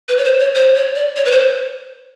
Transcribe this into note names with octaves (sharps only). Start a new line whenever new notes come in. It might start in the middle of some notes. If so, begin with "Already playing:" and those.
B4
C#5
C5
C#5
C5
C#5
D5
C#5
B4
C5